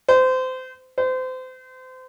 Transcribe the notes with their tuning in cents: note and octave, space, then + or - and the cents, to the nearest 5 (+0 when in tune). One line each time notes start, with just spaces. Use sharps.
C5 -25
C5 -30